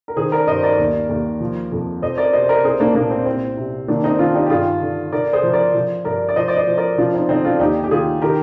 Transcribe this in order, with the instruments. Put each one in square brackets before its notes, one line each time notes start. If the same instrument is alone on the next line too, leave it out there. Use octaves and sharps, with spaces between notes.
[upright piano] A#4
D#3 G#4 C5
A#4 D5
G2 C5 D#5
A#4 D5
D#2
D#2
F3
F2
F2 C5 D#5
A#4 D5
C3 C5 D#5
A#4 D5
C2 G#4 C5
A#3 D4
A#2 A#3 D4
C4
C2 C4
C3
D#3 A#3 D4
C4 D#4
D#3 D4 F4
D#4 G4
G4
G2 F4 G#4
D3
D3 A#4 D5
G#4 C5
F3
A#4 D5
F3
G2 A#4 D5
D5
F3 C5 D#5
D5
C5 D#5
F3
A#4 D5
F3 D4 F4
C4 D#4
D3 C4 D#4
D4 F4
D#2 D#4 G4
G4
D#3 F4 G#4
D#3 G4 A#4